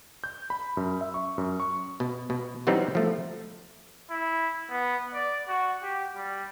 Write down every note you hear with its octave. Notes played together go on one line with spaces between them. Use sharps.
G6
B5
F#2
E5
C#6
F#2
C#6
B2
B2
E3 F#3 G3 B3 C4 D#4
F3 A3
E4
B3
D5
F#4
G4
G3